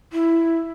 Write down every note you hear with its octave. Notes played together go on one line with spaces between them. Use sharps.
E4